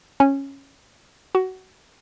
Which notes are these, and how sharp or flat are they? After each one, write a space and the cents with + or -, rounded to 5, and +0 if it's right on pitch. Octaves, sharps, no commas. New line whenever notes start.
C#4 -10
F#4 +20